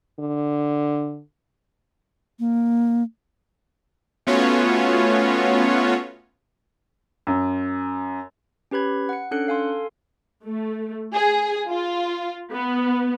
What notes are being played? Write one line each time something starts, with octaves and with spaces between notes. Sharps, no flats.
D3
A#3
A3 B3 C#4 F4 F#4 C#5
F#2
C#4 G4 B4 B5 G#6
F#5 C#7
C#4 D4 A4 F#6 C#7
A4 F5 G#5 C6
A3
G#4
F4
B3